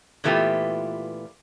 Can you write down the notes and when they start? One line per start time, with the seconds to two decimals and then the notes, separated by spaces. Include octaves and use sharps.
0.24 A#2 E3 A3 B3 F4 G4